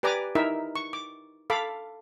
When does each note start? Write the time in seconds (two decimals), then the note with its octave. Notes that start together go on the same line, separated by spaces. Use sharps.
0.03 G4 B4 D5 G#5 A#5 D6
0.35 D#4 E4 A#4 E5
0.76 C#6
0.93 D6
1.50 A4 F5 B5 D6